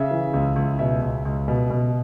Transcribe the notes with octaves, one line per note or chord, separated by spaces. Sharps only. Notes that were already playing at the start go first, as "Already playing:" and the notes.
Already playing: C#3 E5
E3
C#2
C#2
B2 E5
C#2
C#2
B2
B2